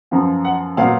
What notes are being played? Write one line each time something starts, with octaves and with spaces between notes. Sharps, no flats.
F#2 F3 B3
F#5
A#2 F#3 B3 F5